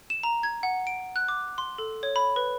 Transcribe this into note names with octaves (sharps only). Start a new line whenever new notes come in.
E7
A#5
G#6
F#5
D7
F#6
D6
C6
A4
C#5
B5
B4